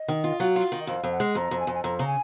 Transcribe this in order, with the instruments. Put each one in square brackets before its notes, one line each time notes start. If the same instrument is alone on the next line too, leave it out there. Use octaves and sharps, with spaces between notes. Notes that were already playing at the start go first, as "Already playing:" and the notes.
Already playing: [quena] D#5
[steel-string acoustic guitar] D#3
F4
[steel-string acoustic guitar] F#3 [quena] F5
[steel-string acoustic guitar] F4
D#3
[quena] D#5
[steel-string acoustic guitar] F2 [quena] F5
[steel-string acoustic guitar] F2
[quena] F#5
[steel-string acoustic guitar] G#3
[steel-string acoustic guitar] F2 [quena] A#5
[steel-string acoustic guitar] F2
[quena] G#5
[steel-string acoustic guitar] F2
[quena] G#5
[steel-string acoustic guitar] F2 [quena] A#5
[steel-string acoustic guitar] C#3 [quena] A#5
[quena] G#5